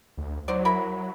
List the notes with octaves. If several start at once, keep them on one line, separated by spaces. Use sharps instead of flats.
D2
F#3 D#4 C5 D5
E4 A#4 B5